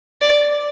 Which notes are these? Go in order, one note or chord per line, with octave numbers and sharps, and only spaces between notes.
D5